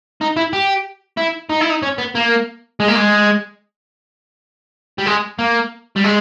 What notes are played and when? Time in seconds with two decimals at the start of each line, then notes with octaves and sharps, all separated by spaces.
0.21 D#4
0.36 E4
0.53 G4
1.17 E4
1.49 D#4
1.60 E4
1.70 D#4
1.82 C#4
1.98 B3
2.15 A#3
2.80 G#3
2.88 A#3
2.96 G#3
4.98 G3
5.06 G#3
5.39 A#3
5.96 G3
6.04 G#3